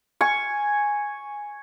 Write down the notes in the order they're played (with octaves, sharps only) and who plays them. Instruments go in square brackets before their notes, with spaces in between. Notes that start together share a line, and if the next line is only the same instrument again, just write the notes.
[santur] G#5 C#6